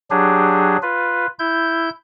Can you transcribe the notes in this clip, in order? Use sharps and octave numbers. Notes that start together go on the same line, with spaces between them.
F#3 D4 G4 G#4
F4 B4
E4 G6